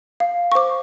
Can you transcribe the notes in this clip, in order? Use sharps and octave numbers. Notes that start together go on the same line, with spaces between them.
F5
C#6
C5 D6